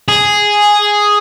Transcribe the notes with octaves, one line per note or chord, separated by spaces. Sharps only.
G#4